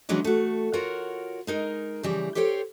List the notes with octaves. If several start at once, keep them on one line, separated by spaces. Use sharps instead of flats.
E3 F#3 G#3 C#4 D4
A3 F#4
F4 F#4 A#4 C#5 F#5
G#3 D#4 A#4
C#3 E3 F3 G3
G4 A4 C5 C#5 G5